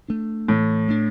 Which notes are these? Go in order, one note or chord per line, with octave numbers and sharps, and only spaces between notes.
A3 D4
A2 E3
A3 D4